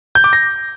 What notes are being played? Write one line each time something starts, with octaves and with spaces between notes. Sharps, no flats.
G6
D6
A#6